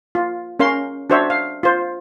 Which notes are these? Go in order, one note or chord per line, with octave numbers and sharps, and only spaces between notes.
F4
C#4 A#4 F5 C6
D4 F#4 C5 C#5 E5
F5
F4 C5